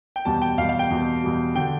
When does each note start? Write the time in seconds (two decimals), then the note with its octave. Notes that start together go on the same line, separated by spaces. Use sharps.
0.16 G5
0.25 E2 B2 G3 A5
0.42 G5
0.58 E2 B2 G3 F5
0.69 F5
0.79 G5
0.90 E2 B2 G3
1.23 E2 B2 G3
1.55 D3 G5